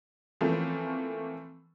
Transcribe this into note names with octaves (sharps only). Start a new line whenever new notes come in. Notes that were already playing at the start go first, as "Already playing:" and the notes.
E3 F3 A3 A#3 C4 C#4